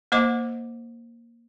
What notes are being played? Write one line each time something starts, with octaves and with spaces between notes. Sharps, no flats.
A#3 C5 D#5 D6